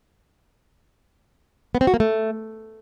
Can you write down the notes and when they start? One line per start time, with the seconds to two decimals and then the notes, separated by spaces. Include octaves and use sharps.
1.75 B3
1.81 C4
1.87 F#4
1.94 A#3
2.00 A3